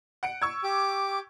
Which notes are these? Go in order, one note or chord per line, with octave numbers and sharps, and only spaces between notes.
F#5 C#7 D7
C#6 E6 G#6
G4 D6